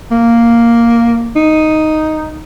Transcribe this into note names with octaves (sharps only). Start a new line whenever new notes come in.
A#3
D#4